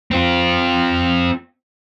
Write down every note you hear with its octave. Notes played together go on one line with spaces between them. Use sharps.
C4 F4